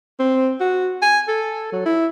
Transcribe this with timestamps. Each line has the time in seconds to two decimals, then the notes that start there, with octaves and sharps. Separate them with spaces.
0.20 C4
0.60 F#4
1.02 G#5
1.28 A4
1.73 F#3
1.86 E4